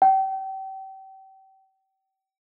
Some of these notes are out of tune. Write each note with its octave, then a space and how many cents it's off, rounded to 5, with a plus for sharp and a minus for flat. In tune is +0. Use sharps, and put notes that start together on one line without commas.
G5 -35